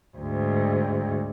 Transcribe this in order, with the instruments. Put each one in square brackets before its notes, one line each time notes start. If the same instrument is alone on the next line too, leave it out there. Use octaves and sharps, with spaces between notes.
[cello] D2 G#2